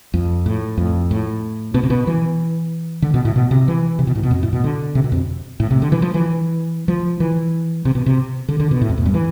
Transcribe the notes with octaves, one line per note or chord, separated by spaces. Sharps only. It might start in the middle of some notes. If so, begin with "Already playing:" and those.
F2
A2
F2
A2
B2
C3
B2
E3
D3
B2
A2
B2
C3
E3
C3
B2
A2
B2
F2
A2
B2
D3
C3
B2
F2
A2
C3
D3
E3
F3
E3
F3
E3
C3
B2
C3
D3
D3
B2
A2
F2
E2
G2
E3